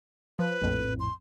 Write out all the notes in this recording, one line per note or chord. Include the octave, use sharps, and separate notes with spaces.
F3 B4
A#1 F2 A2
C6